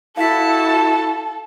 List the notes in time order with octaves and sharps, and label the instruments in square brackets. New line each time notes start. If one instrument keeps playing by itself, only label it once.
[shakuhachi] E4 [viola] F#4 A5 [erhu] A4 [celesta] F5 B6